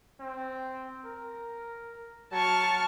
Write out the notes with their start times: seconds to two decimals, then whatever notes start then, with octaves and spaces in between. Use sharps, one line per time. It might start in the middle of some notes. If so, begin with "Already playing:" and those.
0.20 C4
1.05 A#4
2.32 F#3 A5 C#6 F6